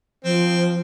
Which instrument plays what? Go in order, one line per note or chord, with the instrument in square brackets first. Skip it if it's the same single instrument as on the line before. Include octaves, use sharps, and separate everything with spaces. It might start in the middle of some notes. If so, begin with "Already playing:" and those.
[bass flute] F3 [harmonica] C4